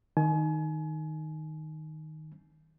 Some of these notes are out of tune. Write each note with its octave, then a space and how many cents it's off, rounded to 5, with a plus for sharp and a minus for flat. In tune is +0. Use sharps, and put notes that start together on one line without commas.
D#3 +0 G#5 +35